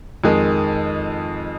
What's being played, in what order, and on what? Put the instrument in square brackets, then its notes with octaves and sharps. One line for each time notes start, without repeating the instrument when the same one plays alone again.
[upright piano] F2 D#3 G#3